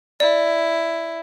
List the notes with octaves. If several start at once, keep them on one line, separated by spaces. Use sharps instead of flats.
E4 D5